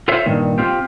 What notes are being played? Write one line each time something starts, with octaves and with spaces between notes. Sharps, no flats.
F4 A4 C5 C#5 E5
G2 A#2 D#3
C4 F4 G4